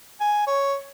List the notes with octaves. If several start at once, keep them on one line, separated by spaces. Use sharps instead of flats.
G#5
C#5